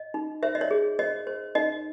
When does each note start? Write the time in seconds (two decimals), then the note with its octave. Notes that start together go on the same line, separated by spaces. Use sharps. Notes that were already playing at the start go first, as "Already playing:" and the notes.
Already playing: D#5
0.14 D#4
0.43 C5 E5
0.55 D#5
0.61 C#5
0.71 G#4
0.99 C5 D#5
1.27 C5
1.55 D#4 D#5